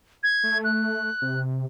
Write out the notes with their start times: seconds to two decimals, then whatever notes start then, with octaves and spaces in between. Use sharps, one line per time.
0.23 G#6
0.43 A3
0.64 F#6
1.22 C3